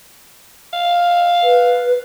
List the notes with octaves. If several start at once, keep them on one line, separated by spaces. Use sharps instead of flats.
F5
B4